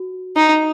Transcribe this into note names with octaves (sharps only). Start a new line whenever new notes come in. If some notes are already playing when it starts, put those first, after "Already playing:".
Already playing: F#4
D#4